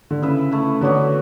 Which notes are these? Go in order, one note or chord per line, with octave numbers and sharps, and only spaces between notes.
D3
C#3 E4 B4 E5
A3 E4 B4
D3 F#3 B3 D4 F#4